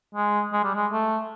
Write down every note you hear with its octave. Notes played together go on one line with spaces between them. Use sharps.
G#3
G#3
G3
G#3
A3